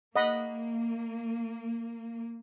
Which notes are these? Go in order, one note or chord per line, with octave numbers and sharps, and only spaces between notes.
A#3 D#5 F#5 B5